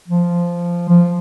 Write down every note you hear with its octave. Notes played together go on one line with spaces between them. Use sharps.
F3
F3